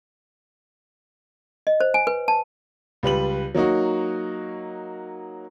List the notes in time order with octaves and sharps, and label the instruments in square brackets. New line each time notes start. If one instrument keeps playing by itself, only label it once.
[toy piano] D#5
C5
G#5
B4
A5
[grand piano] C#2 G3 B4 F#7
F#3 A#3 D#4 F#4